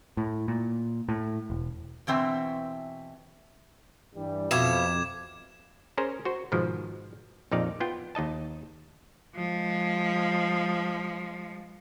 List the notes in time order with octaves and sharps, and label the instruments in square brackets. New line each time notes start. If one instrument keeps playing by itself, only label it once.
[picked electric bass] A2
A#2
A2
E1
[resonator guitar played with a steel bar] B2 E3 C4 E5
[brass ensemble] G2 E3 G3
[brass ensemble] F2 [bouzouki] B2 E5 F5 [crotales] D6 G#6 E7
[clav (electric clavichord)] C#4 G#4 A#4 C5 A#5
F#4 C5
G#2 B2 D#3 F3
A#1 F2 D#4 D5 F5
B3 F4 G5
D#2 D#4 D#5 A5
[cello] F3 G#3